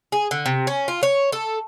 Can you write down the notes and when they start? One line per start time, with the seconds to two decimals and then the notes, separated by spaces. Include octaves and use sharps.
0.12 G#4
0.31 D3
0.46 C3
0.67 C#4
0.88 F4
1.03 C#5
1.32 A4